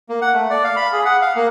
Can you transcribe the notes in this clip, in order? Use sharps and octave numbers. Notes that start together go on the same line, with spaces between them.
A#3
F#5
A3
D5
F5
B5
G#4
F#5
F5
A#3